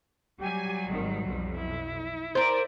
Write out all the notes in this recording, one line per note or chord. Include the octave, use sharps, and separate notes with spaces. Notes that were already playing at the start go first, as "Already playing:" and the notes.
F#3 G3 G4 G#5
G#1 D#3
B1 F2
E4
A#4 C5 D5